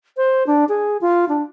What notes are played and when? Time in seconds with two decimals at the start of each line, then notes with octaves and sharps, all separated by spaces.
0.17 C5
0.47 D4
0.69 G#4
1.01 F4
1.29 D4